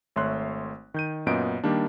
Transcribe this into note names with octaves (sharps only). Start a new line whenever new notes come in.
G#1 A3 C#5 E5 C6 F#6
D#3 G6 D#7
F#2 A#2 B3 D#5 D7
D#3 G3 A#3 D4